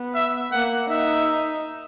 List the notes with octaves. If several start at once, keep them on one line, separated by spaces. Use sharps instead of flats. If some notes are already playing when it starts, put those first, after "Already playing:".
Already playing: B3
E5
A#3 F#5
D#4 E5